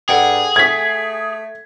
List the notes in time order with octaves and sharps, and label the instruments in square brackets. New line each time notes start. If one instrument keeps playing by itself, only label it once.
[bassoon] G2 [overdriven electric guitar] G#4 [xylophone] A4 F#5 G5
[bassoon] A3 [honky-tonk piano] G#6 B6